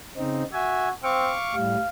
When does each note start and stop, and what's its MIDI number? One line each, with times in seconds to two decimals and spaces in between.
0.17 0.43 49
0.17 0.43 60
0.17 0.43 63
0.53 0.92 66
0.53 0.89 76
0.53 0.89 80
1.03 1.35 60
1.03 1.55 77
1.03 1.55 85
1.03 1.55 86
1.55 1.76 45
1.55 1.76 55
1.55 1.89 77